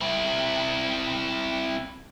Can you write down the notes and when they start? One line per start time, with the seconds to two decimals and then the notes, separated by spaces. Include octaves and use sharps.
0.01 C4 E4